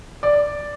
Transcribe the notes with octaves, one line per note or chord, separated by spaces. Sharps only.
D5